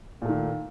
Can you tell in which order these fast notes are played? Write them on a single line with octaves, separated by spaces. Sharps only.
A#2 A3 D#3